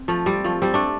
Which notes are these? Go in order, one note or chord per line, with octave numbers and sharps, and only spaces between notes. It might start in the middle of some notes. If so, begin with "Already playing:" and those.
Already playing: C4
F3 A3
G3 C4
F3 A3
G3 C4
A3 D4